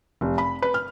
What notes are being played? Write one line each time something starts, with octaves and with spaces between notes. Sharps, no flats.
F1
B5
B4
F6